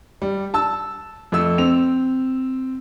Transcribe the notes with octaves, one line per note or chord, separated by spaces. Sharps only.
G3
A5 E6
F2 A3 E6
C4 F7